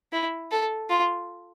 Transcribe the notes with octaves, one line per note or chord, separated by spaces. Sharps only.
E4
A4
F4